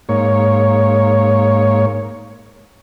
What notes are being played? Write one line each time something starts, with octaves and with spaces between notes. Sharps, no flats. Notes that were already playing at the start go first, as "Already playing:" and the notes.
G#2 A#3 C#5